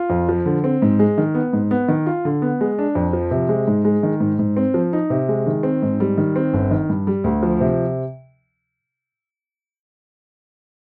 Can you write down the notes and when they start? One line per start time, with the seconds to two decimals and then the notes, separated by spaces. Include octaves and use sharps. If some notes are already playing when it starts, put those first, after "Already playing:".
Already playing: F4
0.10 F2
0.29 F3
0.46 D3
0.64 C4
0.82 G#2
0.99 G#3
1.18 D#3
1.35 B3
1.53 G#2
1.71 B3
1.88 D#3
2.06 F4
2.25 D3
2.42 B3
2.61 G#3
2.79 D4
2.95 F2
3.13 F3
3.31 C3
3.49 G#3
3.68 G#2
3.85 G#3
4.03 D#3
4.20 G#2
4.39 G#2
4.57 C4
4.74 F3
4.93 D#4
5.10 C3
5.29 G#3
5.47 D#3
5.63 C4
5.82 G#2
6.00 G3
6.17 D#3
6.36 C4
6.54 G1
6.71 D#3
6.90 G2
7.07 G3
7.24 D2
7.43 F3
7.60 C3